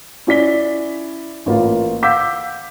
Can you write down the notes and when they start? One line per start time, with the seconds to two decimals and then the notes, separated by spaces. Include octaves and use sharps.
0.27 C#4 E4 D5 B6 G7
1.46 A1 A#3 F4
2.02 F5 F#5 D6 E6 G6 B6